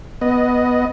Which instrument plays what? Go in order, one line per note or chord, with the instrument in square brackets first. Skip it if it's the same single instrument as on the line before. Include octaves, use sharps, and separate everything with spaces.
[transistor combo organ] B3 D#5